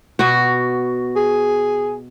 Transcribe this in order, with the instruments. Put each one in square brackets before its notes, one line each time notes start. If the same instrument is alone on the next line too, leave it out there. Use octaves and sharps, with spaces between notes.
[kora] B2 F#4
[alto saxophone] G#4